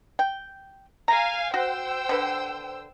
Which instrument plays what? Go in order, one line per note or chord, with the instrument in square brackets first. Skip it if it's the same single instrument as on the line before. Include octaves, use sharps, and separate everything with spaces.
[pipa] G5
[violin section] F5 G#5 [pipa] A#5
[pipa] F#4 [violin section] C5 G5 E6
[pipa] D3 B4